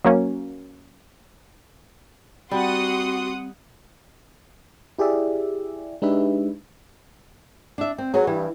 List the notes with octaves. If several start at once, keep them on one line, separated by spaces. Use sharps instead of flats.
F#3 A#3 C#4
G3 C4 F#4 F#5 C6 D#6
E4 G4 G#4 D5 E5
G#3 D4 D#4 G4 B4 E5
D4 E5
C4
F#3 B3 F#4 G#4
G2 E3